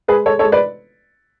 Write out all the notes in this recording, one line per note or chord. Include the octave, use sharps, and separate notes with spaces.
G#3 G#4 B4
G#3 A4 C#5
A4 C#5
G#3
B4 D5